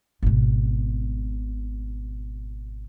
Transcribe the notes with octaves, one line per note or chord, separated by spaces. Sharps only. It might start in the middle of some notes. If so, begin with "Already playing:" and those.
G#1 B2